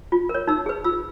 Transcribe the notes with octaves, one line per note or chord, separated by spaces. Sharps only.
F4
A#4
C#5
D#4 E6
G#4 B4
F4 E6